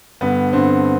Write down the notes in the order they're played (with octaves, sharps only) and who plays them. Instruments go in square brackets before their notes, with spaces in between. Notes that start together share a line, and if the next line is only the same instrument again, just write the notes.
[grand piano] G2 D3 B3
G2 D3 C4